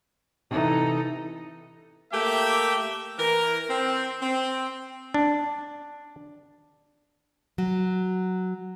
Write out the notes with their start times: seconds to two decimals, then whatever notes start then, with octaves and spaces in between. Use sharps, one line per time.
0.51 C3 E3 D#4 A4
2.13 A3 A#3 G4 E5 G5
3.19 E3 A#4
3.70 C4
4.22 C4
5.14 D4
7.58 F#3